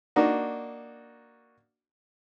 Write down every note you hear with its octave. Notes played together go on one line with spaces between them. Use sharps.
A#3 D4 D#4 F#4